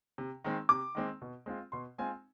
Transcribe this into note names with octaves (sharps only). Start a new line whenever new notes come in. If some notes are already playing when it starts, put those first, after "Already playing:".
C3
D#3 G#3 C4
C3 D6
D#3 G#3 C4
B2
G#3 C4 F4
B2 C6
G#3 C4 F4 G#5